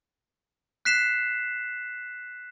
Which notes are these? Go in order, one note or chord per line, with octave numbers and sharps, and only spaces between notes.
F#6 B6 C7 E7